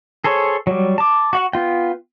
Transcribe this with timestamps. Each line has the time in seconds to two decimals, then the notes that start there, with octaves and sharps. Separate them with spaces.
0.24 G#4 A4 C5 C#5
0.67 F#3 G3
0.98 A5 D6
1.33 F#4 F#5
1.53 B3 F4 G5